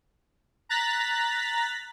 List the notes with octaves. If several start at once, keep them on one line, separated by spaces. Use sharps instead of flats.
A#5 F#6 A6 B6